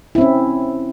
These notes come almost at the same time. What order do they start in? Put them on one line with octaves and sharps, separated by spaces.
E4 C4 C#4